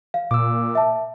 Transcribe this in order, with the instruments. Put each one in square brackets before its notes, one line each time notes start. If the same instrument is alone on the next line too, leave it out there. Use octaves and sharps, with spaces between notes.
[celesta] F5
[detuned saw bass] A#2 [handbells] D6 E6
[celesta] E5 A5